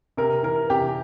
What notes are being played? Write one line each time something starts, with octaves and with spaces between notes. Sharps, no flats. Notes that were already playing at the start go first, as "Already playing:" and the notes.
C3 A#4
E3 A#4
C3 G4